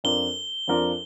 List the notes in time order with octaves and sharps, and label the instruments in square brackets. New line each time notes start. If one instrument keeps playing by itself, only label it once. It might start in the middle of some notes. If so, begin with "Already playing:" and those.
[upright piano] F2 F3 D4 F4 A#4 [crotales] G7
[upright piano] F2 F3 D4 F4 A#4